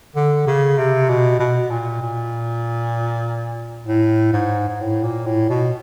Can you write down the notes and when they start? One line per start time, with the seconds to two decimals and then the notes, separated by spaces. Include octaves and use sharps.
0.15 D3
0.47 C#3
0.78 C3
1.09 B2
1.39 B2
1.70 A#2
2.02 A#2
3.87 A2
4.33 G#2
4.68 G#2
4.80 A2
5.03 A#2
5.26 A2
5.49 B2